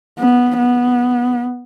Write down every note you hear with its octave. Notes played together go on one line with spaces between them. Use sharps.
B3
B3